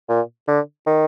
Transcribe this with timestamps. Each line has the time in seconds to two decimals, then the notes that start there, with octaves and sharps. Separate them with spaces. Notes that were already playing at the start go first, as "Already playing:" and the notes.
0.09 A#2
0.48 D3
0.87 D#3